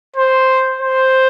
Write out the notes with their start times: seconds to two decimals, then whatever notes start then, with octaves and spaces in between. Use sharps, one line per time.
0.16 C5
0.81 C5